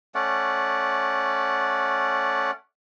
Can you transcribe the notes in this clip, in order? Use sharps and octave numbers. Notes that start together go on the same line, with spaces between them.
A3 C#4 D5 F#5